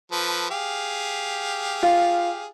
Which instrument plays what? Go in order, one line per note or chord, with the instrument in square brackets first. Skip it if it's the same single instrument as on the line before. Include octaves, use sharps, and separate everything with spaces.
[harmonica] F3 A4 B4
G4 G#4 F5
[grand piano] F4